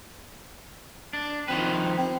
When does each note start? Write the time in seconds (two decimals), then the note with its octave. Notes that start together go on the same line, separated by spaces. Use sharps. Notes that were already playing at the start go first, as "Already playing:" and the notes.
1.13 D4
1.48 D#3 F3 C4 B4
1.98 C4